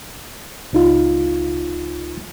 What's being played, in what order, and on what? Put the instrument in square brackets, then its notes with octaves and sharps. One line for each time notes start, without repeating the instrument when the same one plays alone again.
[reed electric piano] C#2 D#4 F4